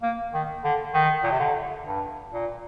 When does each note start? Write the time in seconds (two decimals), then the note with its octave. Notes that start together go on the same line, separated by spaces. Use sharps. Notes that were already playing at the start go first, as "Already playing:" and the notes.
0.02 A#3
0.34 D#3
0.64 D3
0.94 D#3
1.23 A#2
1.31 C3
1.40 D3
1.86 G2
2.32 A#2